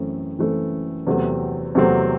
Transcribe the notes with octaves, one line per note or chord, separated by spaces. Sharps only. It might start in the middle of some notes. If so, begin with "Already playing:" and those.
Already playing: F#2 E3 A3 C4
F#2 E3 A3 C4
E2 C3 F#3 A3 C4
E2 C3 F#3 A3 C4